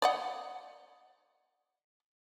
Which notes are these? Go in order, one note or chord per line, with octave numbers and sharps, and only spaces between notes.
D5 D#5 F#5